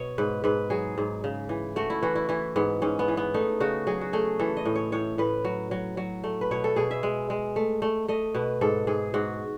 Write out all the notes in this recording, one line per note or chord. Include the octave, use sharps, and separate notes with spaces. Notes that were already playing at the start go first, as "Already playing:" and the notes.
Already playing: B2 C#5 D#5
G#2 B4
G#2 B4
F#3 G#4
G#2
C#3
E3
A3 F#4
E4
E3 F#4
E4
E3 E4
G#2 B3
G#2 C#4
B3
E3
B3
A3 D#4
C#3 F#4
F#3 G#4
F#4
A3 G#4
E3 A4
D#5
A2
C#5
A2 C#5
A2 B4
F#3
F#3
F#3
A3
B4
B2 C#5
A4
B2 G#4
E5
G#3
G#3
A3
A3
A3 D#5
B2 B4
G#2 A4
G#2 G#4
G#2 F#4